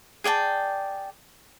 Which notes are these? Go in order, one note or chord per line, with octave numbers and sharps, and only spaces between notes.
G#4 D5 G5 A5